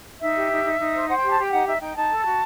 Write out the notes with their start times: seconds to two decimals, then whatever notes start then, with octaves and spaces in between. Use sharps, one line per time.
0.21 D#4 E5
0.36 G4
0.50 D#4
0.64 D#4
0.79 D#4
0.93 C5
1.08 C5 F#5
1.19 G4 G5
1.30 A5
1.38 G4 G5
1.51 D#4 F#5
1.66 D#4 E5
1.81 D#4 G5
1.96 D#4 A5
2.09 A4
2.24 F#4